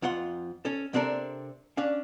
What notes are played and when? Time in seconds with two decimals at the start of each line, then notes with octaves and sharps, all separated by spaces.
0.02 F2 F4 F#5 C6
0.65 C#4 A4
0.93 C3 C4 D4 A4 A#4
1.77 C#4 D4 F5